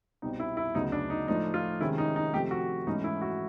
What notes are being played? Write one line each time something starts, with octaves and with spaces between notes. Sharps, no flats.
C2 B2 G3 C4 D#4
E4
E4
D2 C#3 F#3 B3 D#4
D4
D#4
A2 F3 A3 D4 D#4
F4
C3 D#3 G#3 C#4 E4
D#4
D#4
C3 F3 A3 C4 G4
F#4
G#2 E3 A3 C#4 D#4
E4
F#4